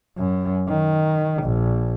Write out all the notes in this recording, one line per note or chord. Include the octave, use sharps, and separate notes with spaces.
F#2
D#3
A#1